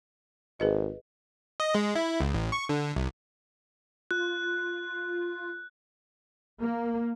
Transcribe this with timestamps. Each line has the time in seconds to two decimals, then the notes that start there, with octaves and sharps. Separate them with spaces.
0.60 G#1 G#4 B4 D#5
1.60 D#5
1.75 G#3
1.95 E4
2.20 C#2
2.34 A1
2.52 C#6
2.69 D3
2.96 C2
4.11 F4 F#6
6.60 A#3